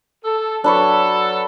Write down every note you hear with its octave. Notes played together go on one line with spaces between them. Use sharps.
A4
F#3 D4 A4 B4 C#5